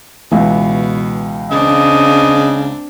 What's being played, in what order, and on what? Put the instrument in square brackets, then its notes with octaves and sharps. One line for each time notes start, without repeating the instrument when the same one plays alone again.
[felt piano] C#2 E3 [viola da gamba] B2
[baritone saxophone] C#3 [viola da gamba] C4 D4 [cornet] D#5